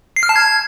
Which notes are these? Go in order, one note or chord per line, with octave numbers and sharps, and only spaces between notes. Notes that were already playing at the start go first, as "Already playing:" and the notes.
C7
F6
A5
G#6